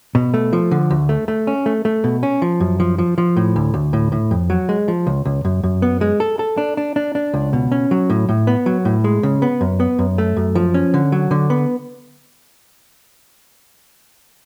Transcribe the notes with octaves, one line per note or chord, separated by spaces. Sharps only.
B2
A3
F3
D3
D2
A3
A3
C#4
A3
A3
B2
C#4
F3
F#2
F3
F3
F3
A2
D2
D2
A2
A2
F2
F#3
G#3
F3
C#2
C#2
F#2
F#2
B3
G#3
A4
A4
D4
D4
D4
D4
C#2
B2
C#4
F#3
A2
A2
B3
F#3
A2
G#3
C#3
B3
F#2
B3
F#2
A3
F#2
F3
C#4
D3
F#3
D3
B3